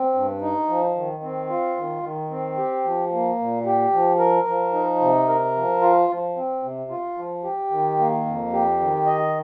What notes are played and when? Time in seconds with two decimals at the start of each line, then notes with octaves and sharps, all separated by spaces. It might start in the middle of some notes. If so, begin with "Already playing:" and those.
Already playing: C4
0.14 G2
0.41 D#4
0.69 F3
0.95 D#3
1.23 C4
1.50 F4
1.77 D#3
2.03 D#3
2.30 C4
2.58 G4
2.84 F3
3.12 A#3
3.39 A#2
3.66 G4
3.93 F3
4.19 A#4
4.47 F3
4.73 D#4
5.00 C3
5.28 A#4
5.55 F3
5.81 F4
6.09 F3
6.36 C4
6.62 C3
6.90 F4
7.17 F3
7.44 G4
7.71 D#3
7.99 A#3
8.26 F2
8.53 G4
8.80 D#3
9.06 D#5